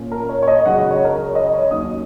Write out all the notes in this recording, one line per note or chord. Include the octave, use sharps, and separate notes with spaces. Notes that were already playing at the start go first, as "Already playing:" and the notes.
Already playing: A#2 A#3 C#4
A#4
C#5
C#5
D#5
C#2 C#3 F#3 F#5
D#5
C#5
A#4
C#5
D#5
C#5
D#2 D#3 F#3 C#4 D#6